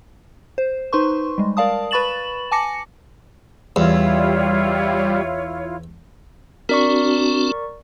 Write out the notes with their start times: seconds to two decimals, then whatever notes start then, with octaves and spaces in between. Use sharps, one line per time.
0.58 C5
0.93 D#4 B4 C5 C6 C#6
1.38 G3 G#3
1.57 A#4 D5 F5 A5 D#6
1.91 B4 B5 C#6 A6 E7 F#7
2.51 G#5 A5 D6 A#6 C#7
3.76 E2 G3 E4 F4 C#5
6.69 C4 D4 F#4 A#4 D5 C#6